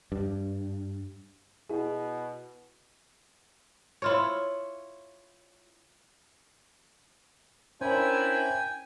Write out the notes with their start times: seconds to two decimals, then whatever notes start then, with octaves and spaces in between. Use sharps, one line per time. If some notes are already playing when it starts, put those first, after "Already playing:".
0.12 G2
1.70 B2 E4 G#4
4.02 E4 F4 C#5
7.81 C#4 D4 E4 A#4 C5 G5 G#5